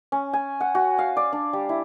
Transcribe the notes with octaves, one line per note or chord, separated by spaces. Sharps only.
C#4
G#5
F#5
F#4
F5
D5
D4
G3
E4